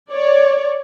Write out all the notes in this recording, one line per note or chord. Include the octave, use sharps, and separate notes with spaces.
C#5 D5